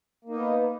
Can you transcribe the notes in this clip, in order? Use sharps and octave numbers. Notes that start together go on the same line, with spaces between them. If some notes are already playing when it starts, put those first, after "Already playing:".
A#3 B3 D#4